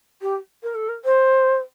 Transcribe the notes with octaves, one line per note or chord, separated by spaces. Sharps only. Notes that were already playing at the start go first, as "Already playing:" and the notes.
G4
A#4
A4
A#4
C5